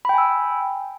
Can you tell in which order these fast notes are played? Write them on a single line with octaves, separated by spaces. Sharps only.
B5 G5 G#5 E6